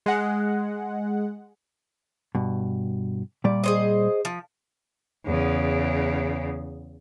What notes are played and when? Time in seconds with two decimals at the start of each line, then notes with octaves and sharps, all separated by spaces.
0.06 G#3 F#5
2.35 G2 B2
3.44 A#2 G3 D5
3.64 G#4 C5 D#5
4.25 F3
5.25 E2 C#3